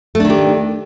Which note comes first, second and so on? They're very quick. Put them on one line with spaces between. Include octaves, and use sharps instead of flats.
A3 D4 D#3 G4